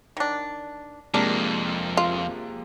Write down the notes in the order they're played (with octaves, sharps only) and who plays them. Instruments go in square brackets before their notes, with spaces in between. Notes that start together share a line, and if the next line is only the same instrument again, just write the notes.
[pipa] D#3 D4
[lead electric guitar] F2 [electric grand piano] C3 G#3 A#3 [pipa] D4 A#4
[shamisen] F4